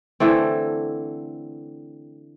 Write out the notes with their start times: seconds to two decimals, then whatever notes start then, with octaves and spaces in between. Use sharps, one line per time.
0.20 D3 E3 A3 C4